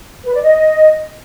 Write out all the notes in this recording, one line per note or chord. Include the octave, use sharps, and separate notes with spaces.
B4
D5
D#5